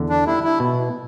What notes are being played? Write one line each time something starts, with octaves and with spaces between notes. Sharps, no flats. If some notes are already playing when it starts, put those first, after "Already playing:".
Already playing: E2 D3
D4
G3 E4
E4
B2